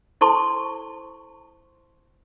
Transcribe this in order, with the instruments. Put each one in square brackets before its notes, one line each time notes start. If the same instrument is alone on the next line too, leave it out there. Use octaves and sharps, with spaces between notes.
[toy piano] E4 A4 C5 A5 C6 C#6